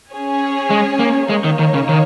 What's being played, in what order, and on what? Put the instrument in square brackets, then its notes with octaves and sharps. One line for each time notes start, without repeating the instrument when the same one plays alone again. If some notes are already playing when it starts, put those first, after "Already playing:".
[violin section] C#4 G#4 C#5 G#5
[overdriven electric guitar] G#3
A#3
[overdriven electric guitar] G#3 [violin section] A#3 D#4 C#5
[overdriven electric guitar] D#3
D#3
C#3
D#3